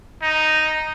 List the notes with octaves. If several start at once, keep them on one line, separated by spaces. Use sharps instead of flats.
D#4